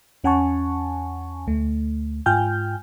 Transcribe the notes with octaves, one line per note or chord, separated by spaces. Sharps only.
E2 C#4 F#5 G#5 A5 C#6
D2 A3
G#2 F4 G5 G#5 F6 G6